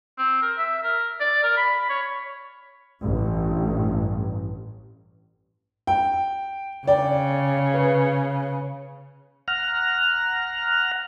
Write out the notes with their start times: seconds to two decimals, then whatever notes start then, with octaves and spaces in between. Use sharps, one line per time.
0.18 C4
0.42 A#4
0.58 E5
0.83 A#4
1.20 D5
1.43 A#4
1.57 B5
1.89 C#5
3.02 A1 G2
5.87 G5
6.87 C#3 D5 G5
7.74 B4
9.48 F#5 A#5 F6